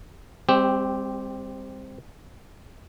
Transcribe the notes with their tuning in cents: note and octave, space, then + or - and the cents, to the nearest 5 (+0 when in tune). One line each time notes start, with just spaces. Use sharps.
G3 +45 C4 +0 G4 -5